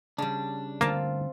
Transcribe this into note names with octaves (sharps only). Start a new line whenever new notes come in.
C#3 G3 D4
D3 G3 A3 A#3 C4 F4 A5